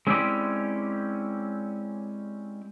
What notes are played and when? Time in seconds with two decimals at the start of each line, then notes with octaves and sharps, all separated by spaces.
0.07 G#3 C4 C#4 E4 G4 D5